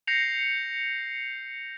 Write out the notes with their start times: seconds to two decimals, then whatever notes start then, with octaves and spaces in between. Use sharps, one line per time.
0.07 G6 A#6 C7 C#7 F7